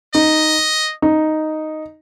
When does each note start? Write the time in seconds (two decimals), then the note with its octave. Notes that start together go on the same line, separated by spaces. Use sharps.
0.14 D#4 D#5
1.02 D#4